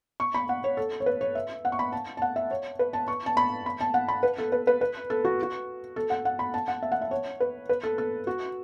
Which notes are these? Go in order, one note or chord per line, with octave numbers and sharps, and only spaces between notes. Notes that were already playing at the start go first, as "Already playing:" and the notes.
C#6
B5
F#5
C#5
A4
C#5
B4
C#5
E5
F#5
C#6
B5
A5
A5
F#5
E5
C#5
B4
A5
C#6
A5
B5
B5
A5
F#5
B5
B4
A4
B4
B4
B4
A4
F#4
F#4
A4
F#5
F#5
B5
A5
F#5
E5
F#5
E5
C#5
B4
B4
A4
A4
F#4